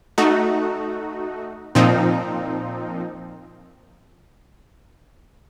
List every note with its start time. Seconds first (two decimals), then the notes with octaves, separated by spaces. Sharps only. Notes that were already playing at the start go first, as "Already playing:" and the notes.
0.18 A3 D#4 F#4
1.75 A#2 F3 C4 D#4